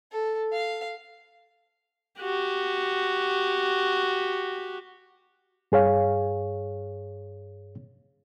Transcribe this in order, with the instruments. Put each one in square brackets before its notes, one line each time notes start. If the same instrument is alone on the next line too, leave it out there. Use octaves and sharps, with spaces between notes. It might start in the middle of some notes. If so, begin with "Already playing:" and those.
[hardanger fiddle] A4
F5
[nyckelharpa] F#4 G4
[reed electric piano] G2 G#4 C#5 F5